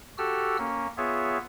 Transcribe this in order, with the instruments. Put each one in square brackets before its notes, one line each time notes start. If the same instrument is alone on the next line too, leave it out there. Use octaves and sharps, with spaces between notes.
[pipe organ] F#4 G4 A4 E6 F6
A#3 C#4
B3 F4 G#4 C#5 E5